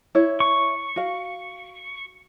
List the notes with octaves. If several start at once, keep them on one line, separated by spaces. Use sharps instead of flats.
E4 C#5
C#6
F#4 F5